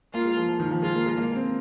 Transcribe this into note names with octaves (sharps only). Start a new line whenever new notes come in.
A#3 F4
G#3
F3
F3
D#3
F3
G#3 F4
A#3
G#3
A#3
C4